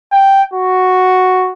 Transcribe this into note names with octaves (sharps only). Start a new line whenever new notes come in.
G5
F#4